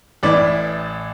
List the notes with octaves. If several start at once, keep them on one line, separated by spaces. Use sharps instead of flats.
A1 A2 E3 D5